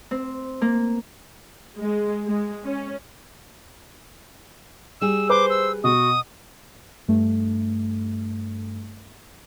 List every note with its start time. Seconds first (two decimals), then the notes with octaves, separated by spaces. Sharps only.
0.11 C4
0.62 A#3
1.78 G#3
2.28 G#3
2.66 C#4
5.01 G3 G#4 E6
5.30 B4 C5 D6
5.50 E6
5.84 B2 F#4 D#6
7.08 G2 A3